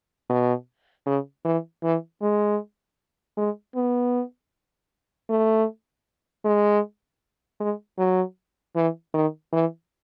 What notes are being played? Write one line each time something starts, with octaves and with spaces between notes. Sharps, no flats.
B2
C#3
E3
E3
G#3
G#3
B3
A3
G#3
G#3
F#3
E3
D#3
E3